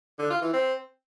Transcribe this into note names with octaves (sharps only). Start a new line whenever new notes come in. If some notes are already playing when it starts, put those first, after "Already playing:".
D3
F4
E3
C4